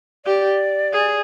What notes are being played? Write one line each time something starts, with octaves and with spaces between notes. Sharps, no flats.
G4 D5
G#4